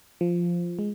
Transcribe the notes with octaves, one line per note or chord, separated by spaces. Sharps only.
F3
G#3